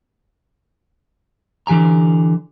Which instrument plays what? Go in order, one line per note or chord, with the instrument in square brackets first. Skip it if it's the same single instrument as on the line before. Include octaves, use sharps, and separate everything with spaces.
[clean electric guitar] D3 E3 G4 G#5 A#5